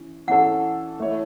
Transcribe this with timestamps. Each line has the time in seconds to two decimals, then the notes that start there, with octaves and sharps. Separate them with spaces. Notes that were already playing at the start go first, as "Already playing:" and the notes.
Already playing: E3 C#4
0.27 E3 C#4 A4 F#5
0.98 E3 A3 E4 C#5